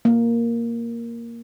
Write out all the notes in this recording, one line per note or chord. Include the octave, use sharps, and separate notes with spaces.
A#3